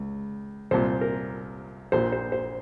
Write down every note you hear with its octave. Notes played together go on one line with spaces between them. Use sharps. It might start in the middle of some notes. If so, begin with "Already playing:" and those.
Already playing: C#2
C2 A#2 C5
A#4
A#1 A#2 C5
C5
C5